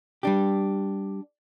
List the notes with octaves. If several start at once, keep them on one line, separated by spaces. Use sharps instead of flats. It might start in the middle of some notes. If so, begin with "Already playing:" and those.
G3 D4 G4